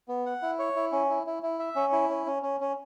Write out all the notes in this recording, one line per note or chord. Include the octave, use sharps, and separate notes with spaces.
B3
F#5
E4
C#5
E4
C#4
E4
E4
E4
E5
C#4
E4
C#4
C#4
C#4
C#4